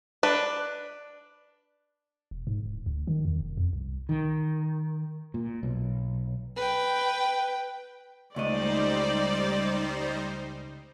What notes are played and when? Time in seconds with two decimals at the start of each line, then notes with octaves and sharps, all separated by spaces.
0.23 D4 B4
2.31 E1
2.47 G#2
2.66 D1
2.86 D2
3.07 D#3
3.25 E2
3.41 F1
3.57 F2
3.73 C2
4.09 D#3
5.34 A#2
5.63 B1
6.56 B4 G5
8.36 C#2 G3 A3 D#4 C5 D5 D#5